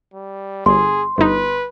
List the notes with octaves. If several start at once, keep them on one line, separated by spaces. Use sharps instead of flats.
G3
G1 G#4 C6
G1 D#4 B4